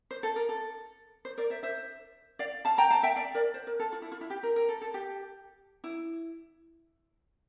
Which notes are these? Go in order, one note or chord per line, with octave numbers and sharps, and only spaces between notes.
C5
A4
A#4
A4
C5
A#4 D5
C5 E5
C5 E5
D5 F5
F5 A5
G5 A#5
F5 A5
E5 G5
D5 F5
A#4 D5
C5
A#4
A4
F4
E4
F4
E4
G4
A#4
A#4
A4
A4
G4
E4